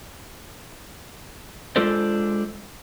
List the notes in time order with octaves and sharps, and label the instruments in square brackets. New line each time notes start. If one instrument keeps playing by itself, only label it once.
[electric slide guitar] G#3 D4 F4 A4 C5 D5